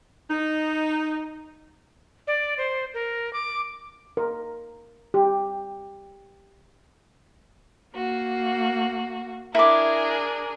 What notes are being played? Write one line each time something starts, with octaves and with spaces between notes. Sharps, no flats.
D#4
D5
C5
A#4
D6
A#4
G4
A#3 F#4
D4 E4 G#4 A#4 D6